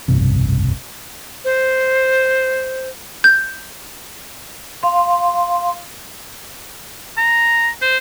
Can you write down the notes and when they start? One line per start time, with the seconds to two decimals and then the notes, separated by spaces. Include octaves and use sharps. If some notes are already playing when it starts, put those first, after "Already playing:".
0.08 F1 B1 G2 C3
1.45 C5
3.24 G6
4.83 F5 C6
7.18 A#5
7.82 C5